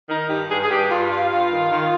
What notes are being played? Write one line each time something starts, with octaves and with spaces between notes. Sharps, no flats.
D#3 D#4
G2 G4
G2 G#4
G#4
G2 G4
G2 F4
G2 F4
G2
D#3
D#3